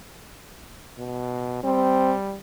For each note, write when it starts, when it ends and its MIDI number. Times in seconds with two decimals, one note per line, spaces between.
0.99 1.62 47
1.64 2.36 55
1.64 2.14 60